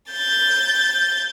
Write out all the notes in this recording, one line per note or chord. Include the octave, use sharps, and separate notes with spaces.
G6 A6